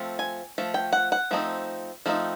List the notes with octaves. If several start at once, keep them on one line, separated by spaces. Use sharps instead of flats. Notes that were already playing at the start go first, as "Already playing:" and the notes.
Already playing: F3 A3 C4
G#5
F3 A3
G5
F#5
F#5
F3 A3 C4 D#4
F3 A3 C4 D#4